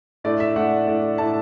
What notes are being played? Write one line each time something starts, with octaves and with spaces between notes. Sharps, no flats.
A2 A3 D4 D5
E5
A2 A3 D4 F#5
A2 A3 D4
A2 A3 D4 A5